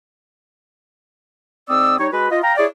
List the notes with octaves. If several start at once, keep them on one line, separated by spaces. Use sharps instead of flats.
G#2 C4 D5 D#6 E6
G3 D#4 C#5
G#3 F#4 B4
F4 D#5
F5 G5 A#5
E4 G#4 C#5 D5